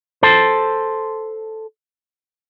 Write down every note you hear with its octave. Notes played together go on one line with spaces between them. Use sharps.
A4 C5